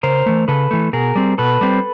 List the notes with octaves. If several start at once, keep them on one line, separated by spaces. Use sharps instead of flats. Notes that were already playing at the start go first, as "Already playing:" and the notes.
C#3 A#4 C5
E3 A3
C#3 A4 B4
E3 A3
B2 G#4 A#4
G3 C4
B2 A4 B4
G3 C4